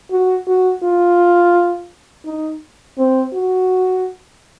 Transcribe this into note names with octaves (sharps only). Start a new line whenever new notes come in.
F#4
F#4
F4
D#4
C4
F#4